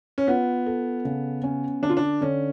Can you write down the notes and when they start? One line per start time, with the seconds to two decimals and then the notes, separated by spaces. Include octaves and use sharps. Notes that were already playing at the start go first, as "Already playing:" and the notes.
0.18 C#4
0.28 B3 F4
0.66 A4
1.05 C#3
1.44 C#4
1.82 D3 D4
1.89 F4
1.97 D4
2.21 D3 C#4